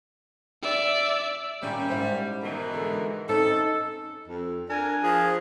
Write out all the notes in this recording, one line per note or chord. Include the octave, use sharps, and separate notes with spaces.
D5 E5
A#2 D#3 G3 C#4
G#2 E4 C5
B2 D#3 E3
D3 G#3
C4 C#4 D#4 A4
F2
D4 A#4 G#5
F3 G#4